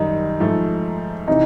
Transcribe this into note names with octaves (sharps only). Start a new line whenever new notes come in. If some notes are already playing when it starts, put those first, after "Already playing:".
Already playing: F#2 D#3 G3 D#4
G#2 F3 A3
C3 E3 D#4